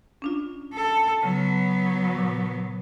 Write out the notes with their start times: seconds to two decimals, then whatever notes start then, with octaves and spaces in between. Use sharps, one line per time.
0.22 C#4 D4 F4
0.73 A4
1.23 C#3 F#3 B3
2.18 A#2